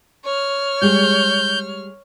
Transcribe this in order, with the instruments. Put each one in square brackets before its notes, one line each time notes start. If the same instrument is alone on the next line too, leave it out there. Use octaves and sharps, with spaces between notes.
[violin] C#5 F6
[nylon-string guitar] G3 G#3 G4 [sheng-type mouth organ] G6